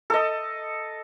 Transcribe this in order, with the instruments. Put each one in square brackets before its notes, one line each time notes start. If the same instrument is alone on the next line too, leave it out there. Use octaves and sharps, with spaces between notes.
[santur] A4 D#5